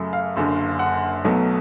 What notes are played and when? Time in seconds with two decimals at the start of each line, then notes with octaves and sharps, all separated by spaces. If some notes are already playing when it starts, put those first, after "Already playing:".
Already playing: F#2 C#3 F#3 A3
0.13 F5
0.36 F#1 F#2 D3
0.79 F#5
1.25 B1 B2 F#3 A3